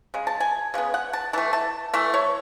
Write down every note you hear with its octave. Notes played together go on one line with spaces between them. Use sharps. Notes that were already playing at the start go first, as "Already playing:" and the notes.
C#3 G#3
A5
G#5
C#3 G#3 B3
F#5
A5
E3 A3 A5
A5
E3 A3 E5
C#5